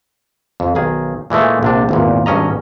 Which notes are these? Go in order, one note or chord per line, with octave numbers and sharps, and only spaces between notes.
F2
B1 D#3 G#4
A#2 E3 G#3 A3
A#1 C3 D4
G#1 E2 A#2
G#1 G2 C#4 D#5 A#5